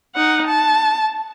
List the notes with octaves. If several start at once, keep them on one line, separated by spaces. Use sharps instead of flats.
D#4 F#5
A5